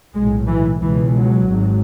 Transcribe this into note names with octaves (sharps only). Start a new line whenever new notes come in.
B1 A2 G#3
E3
C#2 B2 E3
F#3
G#1 G#2